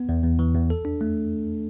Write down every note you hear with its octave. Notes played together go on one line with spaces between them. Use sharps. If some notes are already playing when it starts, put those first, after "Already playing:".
Already playing: B3
E2
E2
E3
E2
A4
D4
A3